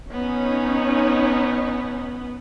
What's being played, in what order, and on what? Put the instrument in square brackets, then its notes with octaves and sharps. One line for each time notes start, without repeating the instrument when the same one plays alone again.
[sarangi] B3 [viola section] C#4 D#4